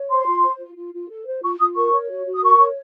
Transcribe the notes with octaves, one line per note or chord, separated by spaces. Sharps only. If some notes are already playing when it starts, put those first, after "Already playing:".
Already playing: C#5
C5 C6
F4
C5
F4
F4
F4
A4
C5
F4 C#6
F4 D#6
A#4 C#6
C#5
F#4
F#4
D#6
A#4 C#6
C#5